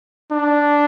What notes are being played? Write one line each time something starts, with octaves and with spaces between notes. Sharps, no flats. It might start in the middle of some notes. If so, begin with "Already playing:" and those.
D4